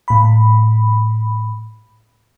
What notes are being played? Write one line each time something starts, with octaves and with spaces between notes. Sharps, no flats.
A2 B5